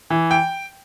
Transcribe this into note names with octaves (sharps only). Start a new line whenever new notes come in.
E3
G5